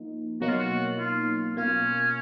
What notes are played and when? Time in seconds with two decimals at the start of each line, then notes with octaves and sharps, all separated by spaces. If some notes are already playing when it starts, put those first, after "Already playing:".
Already playing: F3 A#3 D#4
0.40 B2 F#3 A#3 D#4 F#4
0.49 F4
0.57 F#4
0.98 F4
1.54 B2 A#3 C#4 F4